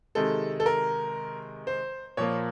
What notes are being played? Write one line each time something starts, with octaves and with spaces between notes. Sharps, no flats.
C3 D#3 G#3 A4
A4
A#4
C5
A#2 F3 A#3 C#5